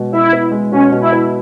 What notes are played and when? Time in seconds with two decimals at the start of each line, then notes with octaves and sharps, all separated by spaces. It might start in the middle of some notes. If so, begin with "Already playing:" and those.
Already playing: B2 G#3 B3
0.12 B2 E4
0.33 B3
0.52 G#3
0.72 B2 C#4
0.92 B2
1.02 E4
1.12 B3